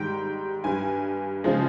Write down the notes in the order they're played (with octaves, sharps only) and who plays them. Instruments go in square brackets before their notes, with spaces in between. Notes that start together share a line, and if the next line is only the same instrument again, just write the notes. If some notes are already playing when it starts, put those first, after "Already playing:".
Already playing: [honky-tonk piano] G#2 D#3 G3 G5
G2 G3 G#5
C#3 F3 G#3